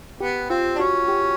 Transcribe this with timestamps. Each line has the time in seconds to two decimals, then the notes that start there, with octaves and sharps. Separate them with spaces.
0.20 B3 G4
0.49 C4 F4
0.75 D4
0.79 C#4 F#4
1.08 G4